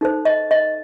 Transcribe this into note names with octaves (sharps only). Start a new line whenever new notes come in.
D#4 A4 C5
D#5
D#5